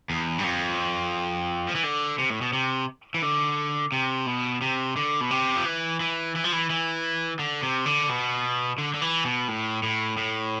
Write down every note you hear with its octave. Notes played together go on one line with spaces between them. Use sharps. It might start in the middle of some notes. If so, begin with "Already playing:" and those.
E2
G2
F2
F3
E3
D3
C3
A2
B2
C3
E3
D3
C3
B2
C3
D3
B2
C3
F3
E3
E3
E3
F3
E3
E3
D3
C3
D3
B2
D3
D3
E3
B2
A2
A2
A2